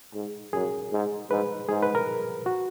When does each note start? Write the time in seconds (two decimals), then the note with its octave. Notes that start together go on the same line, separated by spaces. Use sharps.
0.14 G#2
0.53 F#2 G#4
0.92 G#2
1.30 G#2 B4
1.68 G#2 G#4
1.83 B4
1.95 A#4
2.46 F#4